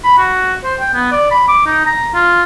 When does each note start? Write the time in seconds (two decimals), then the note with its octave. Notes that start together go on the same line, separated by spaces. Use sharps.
0.04 B5
0.18 F#4
0.64 C5
0.80 G5
0.94 B3
1.12 D5
1.31 B5
1.48 D6
1.66 D#4
1.85 A#5
2.14 F4